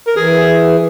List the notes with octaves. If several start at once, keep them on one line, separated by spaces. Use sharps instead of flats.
A#4
E3 G#4